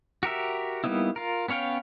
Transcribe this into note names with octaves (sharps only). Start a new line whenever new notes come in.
F#4 G4 A#4 E5
G3 A#3 B3 D#4 E4
F4 A#4
B3 C#4 C#5 F5 G5